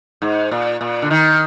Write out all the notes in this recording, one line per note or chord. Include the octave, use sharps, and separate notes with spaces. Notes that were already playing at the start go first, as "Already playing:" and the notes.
G#2
A#2
A#2
D3
D#3